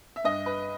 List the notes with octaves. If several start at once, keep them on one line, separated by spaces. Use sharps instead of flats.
E5
G2 D#5
B4